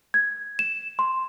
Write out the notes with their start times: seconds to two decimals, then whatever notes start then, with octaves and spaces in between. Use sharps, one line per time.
0.14 G#6
0.59 E7
0.99 C6